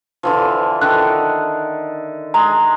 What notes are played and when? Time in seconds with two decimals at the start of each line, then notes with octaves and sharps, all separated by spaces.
0.23 D3 E3 F3
0.81 D3 D#3 F#6
2.34 G#3 A#5